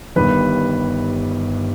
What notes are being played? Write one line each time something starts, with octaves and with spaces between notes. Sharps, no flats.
G1 G2 D#3 B4